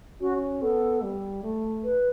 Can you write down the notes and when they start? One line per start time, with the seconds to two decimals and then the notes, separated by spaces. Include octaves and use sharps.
0.21 C#4 F#4
0.62 B3 A4
1.03 G3
1.43 A3
1.84 B4